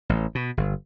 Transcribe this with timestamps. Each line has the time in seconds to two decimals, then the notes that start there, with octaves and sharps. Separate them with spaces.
0.09 A1
0.35 B2
0.57 G1